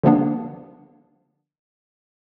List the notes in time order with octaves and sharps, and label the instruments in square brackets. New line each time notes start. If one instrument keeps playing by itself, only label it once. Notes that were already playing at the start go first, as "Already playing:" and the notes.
[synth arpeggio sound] D3 F3 G3 A#3 B3 D4